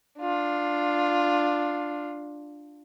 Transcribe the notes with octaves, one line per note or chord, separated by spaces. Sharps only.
D4 F4